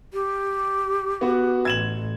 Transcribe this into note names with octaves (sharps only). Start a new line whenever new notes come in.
G4
B3 F#4
A1 G#6 E7 F#7